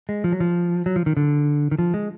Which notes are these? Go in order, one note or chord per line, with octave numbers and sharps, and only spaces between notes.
G#3
F3
F#3
F3
F#3
F3
D#3
D3
D#3
F3
G#3